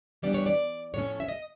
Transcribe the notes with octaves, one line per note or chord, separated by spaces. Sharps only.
E3 G3 B3 D4 D5
C#5
D5
A2 F3 A3 C#4 C#5
E5
D#5